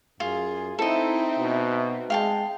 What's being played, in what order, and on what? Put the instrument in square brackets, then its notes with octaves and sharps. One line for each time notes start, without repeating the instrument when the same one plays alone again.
[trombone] F#2 [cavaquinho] F4 [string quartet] G#4
[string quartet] C4 D#4 [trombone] E4 [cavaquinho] A4 D#5 [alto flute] E5
[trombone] B2
[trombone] G#3 [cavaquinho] F5 G5 A5